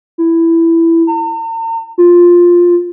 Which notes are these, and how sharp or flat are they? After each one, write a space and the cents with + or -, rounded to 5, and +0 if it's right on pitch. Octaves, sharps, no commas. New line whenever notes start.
E4 +10
A#5 -45
F4 +5